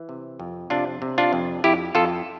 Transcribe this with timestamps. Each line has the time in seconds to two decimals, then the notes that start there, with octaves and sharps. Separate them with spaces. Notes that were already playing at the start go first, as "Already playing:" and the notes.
Already playing: E3
0.09 C3
0.40 F2
0.70 C3 D4 F4
1.02 C3
1.18 D4 F4
1.33 F2
1.64 F2 E4 G4
1.95 F2 F4 A4